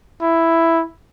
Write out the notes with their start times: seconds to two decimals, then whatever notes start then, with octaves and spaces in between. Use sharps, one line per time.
0.22 E4